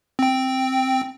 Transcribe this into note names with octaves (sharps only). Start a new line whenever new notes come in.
C4 G5